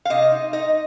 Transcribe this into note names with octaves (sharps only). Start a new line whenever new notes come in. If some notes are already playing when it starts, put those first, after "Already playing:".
F5
C3 D#5
D#4
D#4 D#5